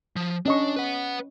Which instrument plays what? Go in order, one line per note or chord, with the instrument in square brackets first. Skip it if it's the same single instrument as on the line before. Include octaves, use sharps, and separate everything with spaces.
[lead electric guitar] F3
[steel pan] C#4 D#5 C#6 [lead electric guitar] D4
[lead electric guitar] B4 F#5